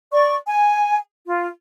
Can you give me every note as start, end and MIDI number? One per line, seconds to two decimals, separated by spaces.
0.13 0.34 74
0.13 0.34 85
0.47 0.96 80
1.26 1.48 65